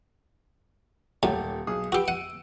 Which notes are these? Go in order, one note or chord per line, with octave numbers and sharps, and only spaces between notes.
D#1 A2 F#3 G4 A4
B1 G#4 D#6
F#4 G4 B4 E6 D7
F#5 D#7